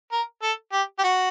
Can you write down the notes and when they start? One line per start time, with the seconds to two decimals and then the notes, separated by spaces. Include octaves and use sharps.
0.12 A#4
0.43 A4
0.72 G4
0.99 G4
1.04 F#4